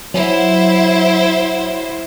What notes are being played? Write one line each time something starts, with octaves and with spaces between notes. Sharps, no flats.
F#3 E4 C5